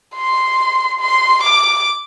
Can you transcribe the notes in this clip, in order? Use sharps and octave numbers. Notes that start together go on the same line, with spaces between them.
C6
C6
D6